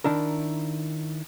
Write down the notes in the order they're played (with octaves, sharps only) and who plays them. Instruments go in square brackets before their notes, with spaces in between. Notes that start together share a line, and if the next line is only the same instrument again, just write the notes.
[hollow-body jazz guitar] D#3 D4 E4 A#4